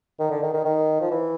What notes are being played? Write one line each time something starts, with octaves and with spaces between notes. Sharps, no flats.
D#3
D3
D#3
D#3
D#3
F3
E3